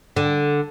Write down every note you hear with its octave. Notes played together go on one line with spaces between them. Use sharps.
D3